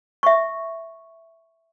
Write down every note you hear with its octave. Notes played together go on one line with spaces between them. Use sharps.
E5 C#6